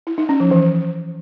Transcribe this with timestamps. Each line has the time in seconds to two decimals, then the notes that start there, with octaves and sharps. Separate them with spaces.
0.07 E4
0.18 D#4
0.29 C#4
0.40 F3
0.51 E3